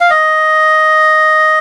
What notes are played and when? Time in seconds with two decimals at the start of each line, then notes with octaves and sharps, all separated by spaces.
0.01 F5
0.10 D#5